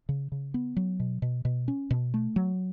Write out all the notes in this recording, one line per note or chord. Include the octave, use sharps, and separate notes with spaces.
C#3
C#3
B3
F#3
B2
B2
B2
C#4
B2
A3
F#3